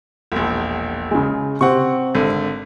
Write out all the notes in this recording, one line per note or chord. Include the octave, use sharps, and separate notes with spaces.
E1 A#1
C#3 G#3
C3 C4 F#5 C#6
G#1 D3